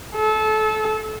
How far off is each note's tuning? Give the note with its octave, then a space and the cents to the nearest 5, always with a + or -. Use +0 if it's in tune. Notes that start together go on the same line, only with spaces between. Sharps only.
A4 -25